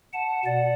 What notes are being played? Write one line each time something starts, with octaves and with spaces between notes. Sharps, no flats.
F#5 A5
B2 D5 F#5